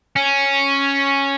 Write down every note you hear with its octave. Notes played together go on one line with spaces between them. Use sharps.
C#4